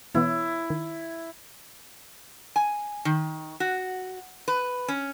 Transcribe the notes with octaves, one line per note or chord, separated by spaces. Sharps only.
B2 E3 B3 E4
D#3
G#5
D#3
F#4
B4
C#4